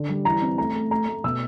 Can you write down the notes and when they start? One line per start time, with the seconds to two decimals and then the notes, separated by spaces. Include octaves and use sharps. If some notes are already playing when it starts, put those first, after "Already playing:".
Already playing: D3
0.09 G3
0.25 E3 A#5
0.41 C4
0.58 A3 A#5
0.75 A3
0.91 A3 A#5
1.08 A3
1.24 B2 E6